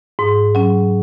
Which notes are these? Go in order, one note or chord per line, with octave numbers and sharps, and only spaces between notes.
G#2
F#3 C#4